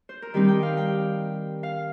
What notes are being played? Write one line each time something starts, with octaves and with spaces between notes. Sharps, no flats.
C5
A#4
D#3 G3 C4 D#4 G4
G5
F5
G5
F5